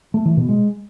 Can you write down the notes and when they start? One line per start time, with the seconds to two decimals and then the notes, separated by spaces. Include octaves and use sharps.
0.14 A3
0.26 E3
0.37 B2
0.49 G#3